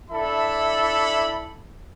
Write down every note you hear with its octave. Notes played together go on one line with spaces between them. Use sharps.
D4 E4 A4 E5 A5 B5